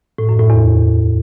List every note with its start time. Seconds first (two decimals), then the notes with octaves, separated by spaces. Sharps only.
0.18 A2
0.29 F#2
0.39 A2
0.50 E2